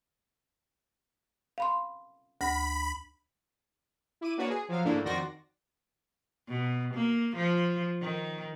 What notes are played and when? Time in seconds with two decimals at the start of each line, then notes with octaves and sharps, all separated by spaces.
1.58 F5 B5 C6
2.41 D2 B5 A#6
4.21 E4 D6 D#7
4.37 A#3 D4 F#4 B4 C#5 D5
4.50 G#4
4.68 F3 F#3 F5
4.84 G#2 D3 A3 A#3 D4 E4
5.05 F2 D#3 F#4 D5 C6 A#6
6.49 B2
6.95 A#3
7.37 F3
8.01 D#3